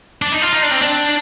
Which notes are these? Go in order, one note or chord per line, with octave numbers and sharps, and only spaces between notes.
D4
D#4
F4
D#4
D4
C4
D4